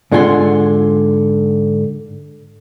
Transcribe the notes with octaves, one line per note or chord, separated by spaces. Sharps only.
G#2 D3 F4 F#5 G#5 C6